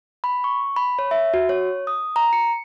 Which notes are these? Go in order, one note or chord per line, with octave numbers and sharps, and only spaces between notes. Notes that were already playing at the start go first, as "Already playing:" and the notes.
B5
C#6
B5
C#5
E5
F#4
C#5
D#6
A#5
C#7